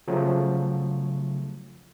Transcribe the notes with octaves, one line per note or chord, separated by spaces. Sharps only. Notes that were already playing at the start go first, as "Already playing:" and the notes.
C#3 F3 F#3 A3